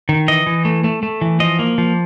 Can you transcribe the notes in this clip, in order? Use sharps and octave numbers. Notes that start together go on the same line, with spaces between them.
D#3
E3 D#5
E3
A3
A3
A3
E3
F3 D#5
A#3
F3